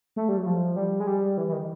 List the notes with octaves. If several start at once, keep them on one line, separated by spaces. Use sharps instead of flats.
A3
G3
F#3
F3
G3
G#3
G3
E3
E3
D#3